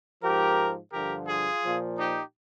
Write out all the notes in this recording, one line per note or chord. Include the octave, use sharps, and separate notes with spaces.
G#2 F3 G4 A#4
G2 D3 F3 G4 A#4
F4 G#4
A#2 F3
D#4 G4